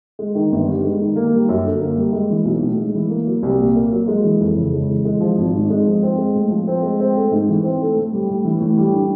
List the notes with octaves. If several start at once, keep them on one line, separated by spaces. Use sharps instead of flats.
G#3
D#3
G1
G2
G#3
D#3
A#3
G3
F#2
D3
A#3
G3
G#3
E3
B1
A2
G#3
E3
A#3
F#3
C2
A#2
A#3
F#3
G#3
E3
F2
C#3
G#3
E3
G#3
F3
G#1
G#2
G#3
F3
C4
G#3
A2
F3
C4
G#3
C4
A3
G#2
E3
C4
A3
A2
G3
A2
E3
A2
G3
D4